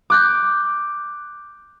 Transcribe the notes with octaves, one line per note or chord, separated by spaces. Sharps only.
D6 F#6 G6